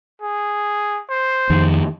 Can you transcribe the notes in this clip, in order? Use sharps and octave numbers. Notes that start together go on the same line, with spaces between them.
G#4
C5
F2 D#3